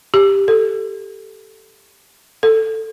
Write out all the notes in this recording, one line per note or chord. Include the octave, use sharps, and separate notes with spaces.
G4
A4
A4